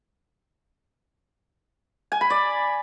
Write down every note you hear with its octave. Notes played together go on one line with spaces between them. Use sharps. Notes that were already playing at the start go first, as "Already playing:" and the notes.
G#5
B5
D5